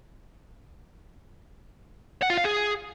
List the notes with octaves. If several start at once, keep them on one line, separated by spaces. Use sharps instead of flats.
F#5
F4
F5
G#4